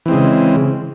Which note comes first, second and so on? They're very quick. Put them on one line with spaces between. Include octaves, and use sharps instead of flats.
E3 C4 G#3 C#3